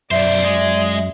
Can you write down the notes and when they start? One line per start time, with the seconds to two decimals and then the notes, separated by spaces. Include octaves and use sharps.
0.11 B1 F#2 C5 D5 E5
0.44 G#3